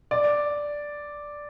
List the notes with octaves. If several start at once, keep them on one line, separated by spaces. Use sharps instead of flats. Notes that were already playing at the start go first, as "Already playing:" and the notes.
D5